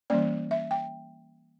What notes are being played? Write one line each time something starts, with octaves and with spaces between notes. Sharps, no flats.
E3 G3 A#3 C#4 D5
E5
G5